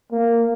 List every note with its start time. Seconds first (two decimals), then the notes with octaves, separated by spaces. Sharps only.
0.12 A#3